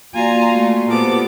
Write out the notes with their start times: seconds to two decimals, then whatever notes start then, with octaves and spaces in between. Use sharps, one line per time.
0.14 A#3 F4 F#4 D5 G#5 A#5 C6
0.53 A3
0.89 A#2 B3 F4 G4 A4 C5 D6